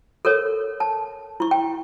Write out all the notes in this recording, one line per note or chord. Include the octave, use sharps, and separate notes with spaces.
A4 A#4 C#5
A5
E4 C#6
G5